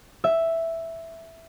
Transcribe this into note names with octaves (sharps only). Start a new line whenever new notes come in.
E5